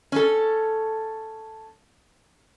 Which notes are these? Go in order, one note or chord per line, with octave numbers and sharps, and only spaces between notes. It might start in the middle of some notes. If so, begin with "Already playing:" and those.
C#4 A4